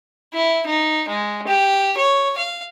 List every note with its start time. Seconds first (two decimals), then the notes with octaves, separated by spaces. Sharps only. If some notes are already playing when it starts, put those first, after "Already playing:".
0.33 E4
0.66 D#4
1.08 G#3
1.47 G4
1.97 C#5
2.37 F5